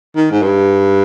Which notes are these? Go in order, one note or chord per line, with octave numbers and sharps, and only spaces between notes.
D#3
G#2
G2